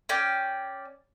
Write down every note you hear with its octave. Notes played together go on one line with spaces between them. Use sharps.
C#4 D5 G5